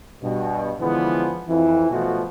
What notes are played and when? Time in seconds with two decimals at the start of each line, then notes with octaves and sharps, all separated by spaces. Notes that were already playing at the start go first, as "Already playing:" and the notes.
0.23 G2 B2
0.80 D3 E3 F3 G#3 B3
1.49 F2 E3
1.90 B1 B2 F3 A3 F#4